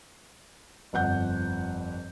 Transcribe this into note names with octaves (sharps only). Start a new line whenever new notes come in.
G1 F2 F#5 G6